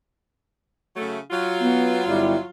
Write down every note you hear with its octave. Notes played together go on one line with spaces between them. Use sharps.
C#3 F#3 A3
F#3 F4
B3
G1 G3 E4